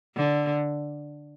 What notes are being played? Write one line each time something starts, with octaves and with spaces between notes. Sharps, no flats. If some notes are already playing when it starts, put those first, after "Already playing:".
D3